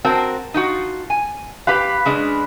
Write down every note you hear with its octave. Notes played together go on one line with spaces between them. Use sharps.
C4 F#4 A#4 A5
D#4 F4 F#4
G#5
G4 B4 F5 B5
C#3 G#3 D4